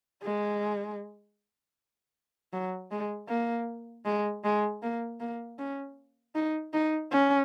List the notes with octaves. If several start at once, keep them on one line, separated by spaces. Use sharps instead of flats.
G#3
F#3
G#3
A#3
G#3
G#3
A#3
A#3
C#4
D#4
D#4
C#4